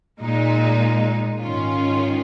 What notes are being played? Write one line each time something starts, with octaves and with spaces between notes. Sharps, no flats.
A#2 G#3 D#4
G#2 D#3 C#4 F4